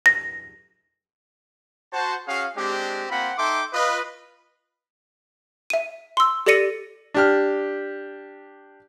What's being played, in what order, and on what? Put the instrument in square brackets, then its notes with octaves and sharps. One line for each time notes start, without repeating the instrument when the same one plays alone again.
[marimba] A#6
[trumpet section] F#4 C5 A5
C#4 F#4 G#4 F5
G#3 C4 D4 G4
A#3 C4 F4 F#5 B5
D#4 A4 E5 G5 C6 D6
F4 B4 D#5
[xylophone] E5 D#7
C6 E6
G4 A4 D5 A#6 C#7 D#7
[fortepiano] D4 G4 F6